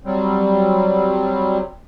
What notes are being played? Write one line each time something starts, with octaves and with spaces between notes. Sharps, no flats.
F#3 G3 C4